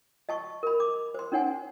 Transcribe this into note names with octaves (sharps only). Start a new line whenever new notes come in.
D#5 A5 C#6
A#4 B5
D6
C5 C6
C#4 D#4 C#5 F#5 G#5